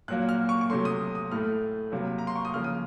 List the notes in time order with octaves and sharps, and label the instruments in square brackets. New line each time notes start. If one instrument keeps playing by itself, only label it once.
[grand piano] A#2 F#3 A#3 F#6
F6
C#6
C#6
C3 F#3 A3 C6
D#6
D#6
A2 A3 F6
C3 F#3 A#3
A#5
C6
C#6
D#6
C#3 F3 A#3 F6
D#6